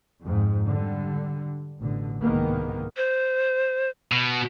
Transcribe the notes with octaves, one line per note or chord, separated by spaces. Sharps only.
F2 G#2
D3 G3
A1 B2 D3
C2 G#2 D#3 G#3 A#3 B3
C5
B2